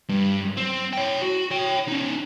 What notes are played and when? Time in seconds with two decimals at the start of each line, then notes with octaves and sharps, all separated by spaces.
0.09 G2
0.57 C4
0.93 C#5 G5
1.22 F#4
1.51 C#5 G5
1.87 C#4 D#4